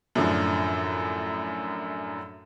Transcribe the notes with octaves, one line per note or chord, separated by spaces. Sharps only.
F#2 A2 D3 F3